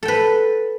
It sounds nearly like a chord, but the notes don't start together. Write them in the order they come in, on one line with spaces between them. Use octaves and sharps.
A4 G5 B4